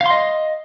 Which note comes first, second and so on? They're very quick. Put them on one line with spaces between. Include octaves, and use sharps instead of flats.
F5 C6 D#5